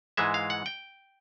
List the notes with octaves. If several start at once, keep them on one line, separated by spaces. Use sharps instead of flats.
G#2 E3 G#3 E5
F5
F#5
G5